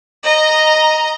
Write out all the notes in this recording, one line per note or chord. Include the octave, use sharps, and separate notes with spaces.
D#5 A#5